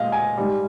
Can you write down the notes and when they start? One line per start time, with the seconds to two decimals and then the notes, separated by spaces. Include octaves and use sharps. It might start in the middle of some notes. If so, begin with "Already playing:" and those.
Already playing: A#2 G#3 D#5 F5
0.12 G#5
0.37 G#2 G3